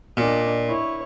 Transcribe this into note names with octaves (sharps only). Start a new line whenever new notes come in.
A#2 D4 D#5
E4 C#5